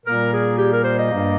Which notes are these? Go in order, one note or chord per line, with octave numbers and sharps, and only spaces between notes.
A#2 G3 A#3 A#4
G#4
G4
A#4
C5
D#5
G2 G3 A#3